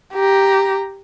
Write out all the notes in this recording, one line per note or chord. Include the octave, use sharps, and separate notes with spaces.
G4 A#5